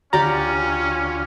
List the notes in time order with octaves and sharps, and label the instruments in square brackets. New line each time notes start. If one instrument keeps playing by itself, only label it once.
[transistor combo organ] D2 F4 [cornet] C#4 [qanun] G4 D5 F#5 [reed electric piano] A#5